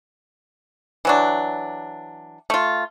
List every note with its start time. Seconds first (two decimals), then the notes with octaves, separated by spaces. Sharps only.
1.05 E3 F#3 D4
2.50 A3 F4